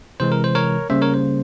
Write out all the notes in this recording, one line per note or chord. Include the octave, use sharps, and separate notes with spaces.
C3 E3 G#3 C5
A#4
C5
A#4 C#5
C#3 G3 A#3 C#4 C5 E5
A#4 C#5
C5